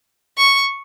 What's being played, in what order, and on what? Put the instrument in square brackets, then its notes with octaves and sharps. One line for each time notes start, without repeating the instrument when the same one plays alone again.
[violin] C#6